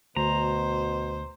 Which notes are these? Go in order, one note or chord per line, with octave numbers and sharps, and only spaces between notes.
D2 B2 C5 A#5